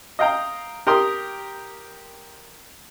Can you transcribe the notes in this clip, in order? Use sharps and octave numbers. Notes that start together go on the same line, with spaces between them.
D#5 F5 G5 A#5
G4 A#4 G5 C6 D#6